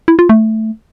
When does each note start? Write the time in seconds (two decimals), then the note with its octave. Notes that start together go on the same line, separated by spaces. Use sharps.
0.08 E4
0.19 F4
0.29 A3